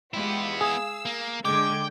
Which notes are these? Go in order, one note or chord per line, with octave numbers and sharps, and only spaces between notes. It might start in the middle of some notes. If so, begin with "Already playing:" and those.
G#3 B3 E4 F4 G4
G#4 F5 E6
A#3
D3 G#3 G5 D6 G#6